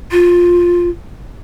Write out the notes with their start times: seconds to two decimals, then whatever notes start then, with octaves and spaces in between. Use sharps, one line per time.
0.11 F4